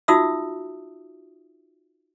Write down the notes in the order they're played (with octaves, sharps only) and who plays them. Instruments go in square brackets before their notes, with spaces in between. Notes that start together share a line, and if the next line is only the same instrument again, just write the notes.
[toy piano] D#4 F4 F#4 E5 D#6 E6